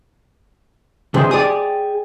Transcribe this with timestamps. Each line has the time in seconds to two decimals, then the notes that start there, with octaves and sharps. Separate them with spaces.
1.14 C3 E3 D4 G#4 C5
1.31 G4 G#4 D5 D#6